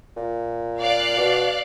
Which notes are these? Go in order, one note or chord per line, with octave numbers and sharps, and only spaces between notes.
A#2
D5 F5 F#6
B2